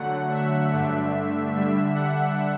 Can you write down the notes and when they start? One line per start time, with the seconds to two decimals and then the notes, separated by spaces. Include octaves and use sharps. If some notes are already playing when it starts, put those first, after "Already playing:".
Already playing: D3 F#3 A3 F#5
0.31 E5
0.72 G2 D3 A3 D4
1.54 D3 G3 D4 E5
1.94 F#5